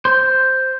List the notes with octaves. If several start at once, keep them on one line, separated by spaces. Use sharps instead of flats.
C5